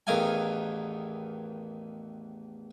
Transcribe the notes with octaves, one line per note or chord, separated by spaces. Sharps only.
A1 E2 D#3 D#5 F5 G#5